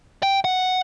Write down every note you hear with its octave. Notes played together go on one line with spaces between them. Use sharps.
G5
F#5